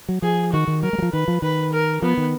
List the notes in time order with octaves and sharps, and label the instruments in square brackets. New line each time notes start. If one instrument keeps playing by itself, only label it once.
[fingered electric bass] F#3
[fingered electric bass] F3 [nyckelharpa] G#4
[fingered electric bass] D#3 [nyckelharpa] F#4
[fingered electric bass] D#3
[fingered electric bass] F#3 [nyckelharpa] A#4
[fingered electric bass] G#3
F#3
F3
[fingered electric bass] D#3 [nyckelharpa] B4
[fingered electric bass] F3
[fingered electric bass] D#3 [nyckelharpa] B4
[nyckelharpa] A#4
[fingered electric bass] F3 [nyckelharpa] B3
[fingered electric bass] D#3